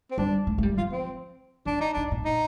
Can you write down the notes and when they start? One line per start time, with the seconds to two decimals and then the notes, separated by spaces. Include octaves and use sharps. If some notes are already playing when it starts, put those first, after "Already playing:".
0.11 C4
0.18 G3 D4
0.47 A3
0.58 A3
0.63 G3
0.78 F3 F4
0.92 C4
1.66 D#3 D4
1.81 D#4
1.94 D3 D4
2.11 A#2
2.25 D#4